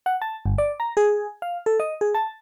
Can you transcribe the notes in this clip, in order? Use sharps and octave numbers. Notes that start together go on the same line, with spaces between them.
F#5
A5
G1
D5
A#5
G#4
F5
A4
D#5
G#4
A5